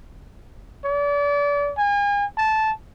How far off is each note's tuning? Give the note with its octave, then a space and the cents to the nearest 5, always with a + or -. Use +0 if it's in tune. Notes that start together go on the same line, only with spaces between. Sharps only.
D5 -35
G#5 -40
A5 -10